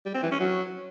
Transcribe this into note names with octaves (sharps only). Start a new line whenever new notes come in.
G3
C4
E3
C#4
F#3